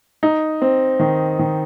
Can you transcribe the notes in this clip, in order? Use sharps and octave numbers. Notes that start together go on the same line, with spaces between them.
D#4
C4
D#3
D#3